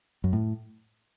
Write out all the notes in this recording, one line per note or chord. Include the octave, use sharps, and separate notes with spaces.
F#2
A2